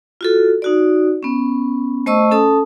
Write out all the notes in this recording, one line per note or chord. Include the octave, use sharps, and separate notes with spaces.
F4 F#4 A4
D#4 F#4 D5
B3 C#4
A3 C5 D#5 A5 C#6 E6
C#4 A4 A5 D#6